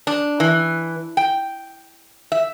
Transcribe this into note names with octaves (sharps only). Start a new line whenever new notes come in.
D4
E3
G5
E5